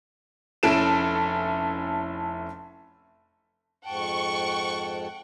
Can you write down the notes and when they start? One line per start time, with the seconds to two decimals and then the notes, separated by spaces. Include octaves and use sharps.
0.63 F1 C#4 E4 A4 D7 E7
3.85 F2 G#2 F#5 G5 A5 C#6